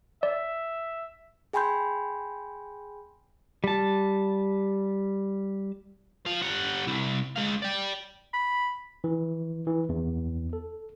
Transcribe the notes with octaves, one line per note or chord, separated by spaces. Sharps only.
D5 E5
G#4 G5 G#5 B5 C6 G6
G3 A5
F3 F5
G3 F#5
C2 E4
G#3 F5
D5 G5
B5
E3
E3
E2
A4